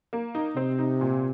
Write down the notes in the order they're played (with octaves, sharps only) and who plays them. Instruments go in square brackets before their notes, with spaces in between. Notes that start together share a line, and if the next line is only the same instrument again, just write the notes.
[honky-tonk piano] A#3
D#4
[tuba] C3 [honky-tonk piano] C4
[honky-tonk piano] D#4
A#2